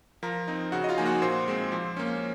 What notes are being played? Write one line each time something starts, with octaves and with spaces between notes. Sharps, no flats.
F3 A#4 A#5
C4 D#4
C#3 F#4 F#5
D#5
F4 F5
F3 A#3 D#4 G#5
F#4 F#5
A#2 C5 C6
G#3 C4
F3
A#3 C#4